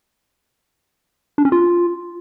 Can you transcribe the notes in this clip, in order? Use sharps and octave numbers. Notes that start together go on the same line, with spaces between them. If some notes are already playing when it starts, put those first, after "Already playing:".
D4
C#4
F4